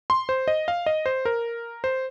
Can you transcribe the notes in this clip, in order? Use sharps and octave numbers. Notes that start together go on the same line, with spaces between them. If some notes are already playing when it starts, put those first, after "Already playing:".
C6
C5
D#5
F5
D#5
C5
A#4
C5